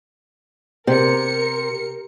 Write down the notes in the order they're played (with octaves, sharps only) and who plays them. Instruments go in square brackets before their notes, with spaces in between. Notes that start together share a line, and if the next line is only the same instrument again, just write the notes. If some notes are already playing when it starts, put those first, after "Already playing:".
[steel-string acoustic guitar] C3 [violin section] A#4 C#7